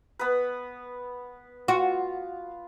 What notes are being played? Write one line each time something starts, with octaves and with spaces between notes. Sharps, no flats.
B3 B4
F4 F#4